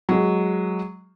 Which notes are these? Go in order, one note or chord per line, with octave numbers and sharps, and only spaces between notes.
F#3 G#3